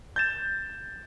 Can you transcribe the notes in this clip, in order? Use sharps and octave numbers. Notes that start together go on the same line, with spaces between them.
G6 A6 E7